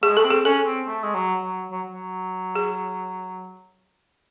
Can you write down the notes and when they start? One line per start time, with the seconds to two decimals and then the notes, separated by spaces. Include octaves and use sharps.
0.03 A3 G#4
0.09 G#3
0.17 A3 A4
0.24 C4
0.30 G#4
0.45 C#4 A4
0.66 C4
0.87 A3
1.03 G#3
1.14 F#3
1.43 F#3
1.71 F#3
1.92 F#3
2.55 G#4